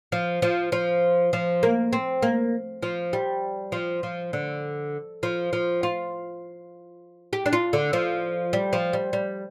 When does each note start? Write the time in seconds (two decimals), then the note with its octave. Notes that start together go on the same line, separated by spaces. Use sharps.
0.12 F3
0.42 F3
0.72 F3
1.33 F3
1.63 A#3
1.93 C4
2.22 A#3
2.83 F3
3.13 G3
3.72 F3
4.03 F3
4.33 D3
5.23 F3
5.53 F3
5.83 F4
7.33 G4
7.46 D4
7.53 F4
7.73 D3
7.93 F3
8.53 G3
8.73 F3
8.93 G3
9.13 G3